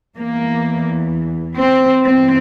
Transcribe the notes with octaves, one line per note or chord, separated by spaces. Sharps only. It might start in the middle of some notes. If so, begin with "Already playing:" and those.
E2 E3 A#3
C4
G2 E3 C4